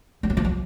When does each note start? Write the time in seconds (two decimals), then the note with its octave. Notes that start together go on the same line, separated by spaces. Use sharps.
0.23 G3
0.30 F#3
0.37 F3
0.45 F#3